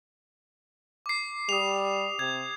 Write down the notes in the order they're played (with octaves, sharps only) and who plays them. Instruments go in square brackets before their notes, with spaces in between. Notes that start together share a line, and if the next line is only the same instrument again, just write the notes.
[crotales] D6 C7
[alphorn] G3 [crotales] D#6 F7
[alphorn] C3 [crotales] G#6